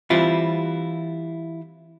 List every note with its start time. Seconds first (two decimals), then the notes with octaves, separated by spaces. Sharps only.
0.10 E3 G3 C4 E4 F4